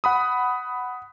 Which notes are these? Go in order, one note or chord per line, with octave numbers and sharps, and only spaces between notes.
F#5 B5 D#6